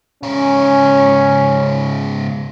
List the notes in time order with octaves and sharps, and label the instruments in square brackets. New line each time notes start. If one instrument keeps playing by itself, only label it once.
[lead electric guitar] G#2 C#3 [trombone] C#4